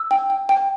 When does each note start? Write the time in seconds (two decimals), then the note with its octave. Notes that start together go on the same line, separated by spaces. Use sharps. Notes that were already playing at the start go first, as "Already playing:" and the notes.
Already playing: E6
0.11 G5
0.30 G5
0.49 G5